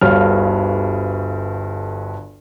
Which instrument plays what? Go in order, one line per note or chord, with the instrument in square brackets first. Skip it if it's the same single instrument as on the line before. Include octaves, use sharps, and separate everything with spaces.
[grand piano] G1 D2 G2 C#5 F5 F6